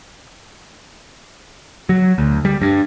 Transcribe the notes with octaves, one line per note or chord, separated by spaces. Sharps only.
F#3
D2
G3
G2